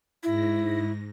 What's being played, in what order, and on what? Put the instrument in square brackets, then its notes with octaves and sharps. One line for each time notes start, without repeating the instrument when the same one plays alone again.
[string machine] G#2 A#6 [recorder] E4